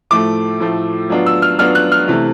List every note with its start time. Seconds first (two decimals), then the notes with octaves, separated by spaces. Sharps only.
0.11 A2 F3 A3 D6
0.60 A2 F3 A3
1.10 F#3 B3 D4 F4
1.26 E6
1.42 F6
1.59 F#3 B3 D4 F4 F6
1.75 F#6
1.92 F6
2.08 C3 E3 A3